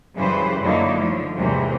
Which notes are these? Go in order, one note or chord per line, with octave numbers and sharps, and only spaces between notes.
F#2 C#3 E3 G3 B4 C5
F#2 D3 F#3 A#3 D#4 E4
D3 F3 A3
E2 G#2 C3 E3 F#3 A#3